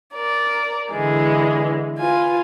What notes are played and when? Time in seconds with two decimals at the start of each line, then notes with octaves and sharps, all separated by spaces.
0.15 A#4 D5
0.91 D3 E3 G#3
1.99 F4 B4 G#5